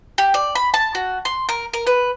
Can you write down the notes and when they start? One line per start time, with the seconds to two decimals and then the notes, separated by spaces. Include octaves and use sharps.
0.18 G4
0.34 D5
0.55 B5
0.74 A5
0.95 F#4
1.25 C6
1.49 A#4
1.73 A#4
1.86 B4